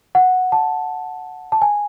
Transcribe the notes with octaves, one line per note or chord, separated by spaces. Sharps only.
F#5
A5
A5
G#5